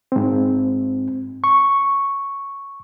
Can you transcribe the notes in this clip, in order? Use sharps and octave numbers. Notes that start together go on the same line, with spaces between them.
G#2 C4
C#6